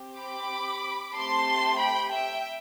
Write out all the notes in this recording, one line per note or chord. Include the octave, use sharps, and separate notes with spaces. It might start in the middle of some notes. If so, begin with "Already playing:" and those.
Already playing: C4 G4
B5 D6
A3 C4 G4 A5 C6
G5 B5
E5 G5